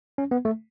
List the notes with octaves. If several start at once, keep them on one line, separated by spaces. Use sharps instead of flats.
C#4
B3
A3